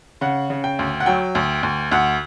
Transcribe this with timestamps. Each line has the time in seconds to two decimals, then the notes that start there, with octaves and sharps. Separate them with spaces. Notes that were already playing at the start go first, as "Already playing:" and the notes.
0.21 C#3 F#5
0.50 C#3
0.64 G5
0.79 D2
1.00 F#5
1.06 F#3 G5
1.35 D2
1.63 D2
1.91 D2 F#5